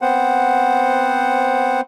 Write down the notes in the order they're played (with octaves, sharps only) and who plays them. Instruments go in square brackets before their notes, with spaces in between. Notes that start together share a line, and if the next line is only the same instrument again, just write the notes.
[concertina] B3 C4 C5 F#5